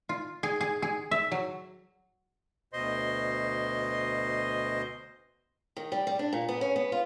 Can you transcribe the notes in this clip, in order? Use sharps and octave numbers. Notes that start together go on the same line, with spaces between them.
F4
G#4
G#4
G#4
E5
F#3
D2 B2 C5 D#5 C6
D#3
G3
G3
D4
A#2
B3
C#4
B3
F4